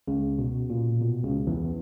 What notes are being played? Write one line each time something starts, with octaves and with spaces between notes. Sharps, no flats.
C#2 C#3
B2
A#2
B2
C#2 C#3
E2 E3